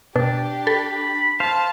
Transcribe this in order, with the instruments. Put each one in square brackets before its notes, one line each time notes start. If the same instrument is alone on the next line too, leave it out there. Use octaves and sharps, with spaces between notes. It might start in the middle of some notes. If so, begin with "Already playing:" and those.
[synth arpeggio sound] B2 [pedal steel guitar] D4 [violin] G4
[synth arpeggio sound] A4 [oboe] B5
[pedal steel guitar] C5 F5 [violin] A5